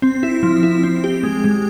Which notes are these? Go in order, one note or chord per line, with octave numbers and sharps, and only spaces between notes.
C4
E4
F3
E4
C4
G4
G#3
G#3